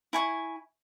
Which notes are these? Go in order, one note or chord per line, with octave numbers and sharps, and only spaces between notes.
E4 G#5 C#6